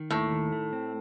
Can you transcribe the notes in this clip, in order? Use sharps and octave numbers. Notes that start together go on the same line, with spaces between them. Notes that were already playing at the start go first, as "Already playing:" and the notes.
Already playing: D#3
D#2 A2
D#3
A3
C4